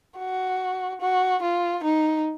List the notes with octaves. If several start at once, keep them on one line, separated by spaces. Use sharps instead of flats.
F#4
F#4
F4
D#4